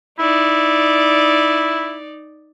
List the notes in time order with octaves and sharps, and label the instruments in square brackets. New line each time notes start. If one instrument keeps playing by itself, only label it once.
[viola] D#4 D5 [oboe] E4